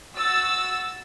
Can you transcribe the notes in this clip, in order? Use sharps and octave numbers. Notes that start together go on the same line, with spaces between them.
F#4 E6 A6